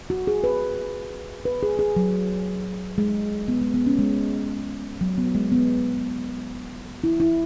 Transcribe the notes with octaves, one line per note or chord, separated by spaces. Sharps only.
F#4
G#4
B4
B4
G#4
G#4
F#3
G#3
B3
G#3
B3
C#4
G#3
F#3
B3
G#3
B3
E4
E4